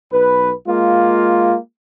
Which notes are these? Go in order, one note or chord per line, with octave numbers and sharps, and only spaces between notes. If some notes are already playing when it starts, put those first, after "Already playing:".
B1 B4
G#3 A#3 F4